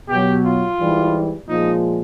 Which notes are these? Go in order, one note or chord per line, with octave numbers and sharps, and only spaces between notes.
B2 G4
F#3
F4
G#2 E3 G3
A#2 F3 G#3 D#4